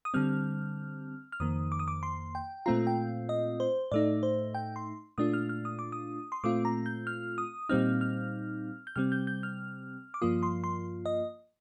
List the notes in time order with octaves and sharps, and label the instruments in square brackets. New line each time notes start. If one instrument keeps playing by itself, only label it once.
[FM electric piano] D#6
D3 G3 C4 F6
F6
F2 D#3 A#3 D#6
D6
D#6
D6
C6
G5
A#2 A3 C4 F4 A#5
G5
D#5
C5
A2 A3 D#4 D5
C5
G5
C6
A#2 A3 D4 F4 D#6
F6
F6
D#6
D6
D#6
C6
A#2 A3 C4 F4 D6
A#5
G6
F6
D#6
A#2 G3 C4 D#4 F6
F6
G6
C3 G3 C4 F6
G6
G6
F6
D6
G2 F3 A#3 F4 D#6
C6
C6
D#5